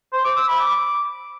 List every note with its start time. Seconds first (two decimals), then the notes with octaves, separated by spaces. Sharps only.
0.13 C5
0.24 D6
0.36 E6
0.48 B5
0.59 D6